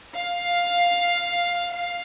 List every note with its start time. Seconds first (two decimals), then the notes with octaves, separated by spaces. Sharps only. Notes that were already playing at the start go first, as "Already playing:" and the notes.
0.14 F5
1.73 F5